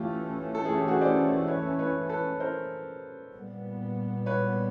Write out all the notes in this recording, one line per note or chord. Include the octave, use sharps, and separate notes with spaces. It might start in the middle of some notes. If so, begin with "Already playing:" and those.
Already playing: E3 A3 C#4 F4 G4
A4
G#4
G4
F#4 G#4
C5 D5
B4 C#5
B4 C#5
A4 B4
A#4 C5
A#2 G3 B3
B4 C#5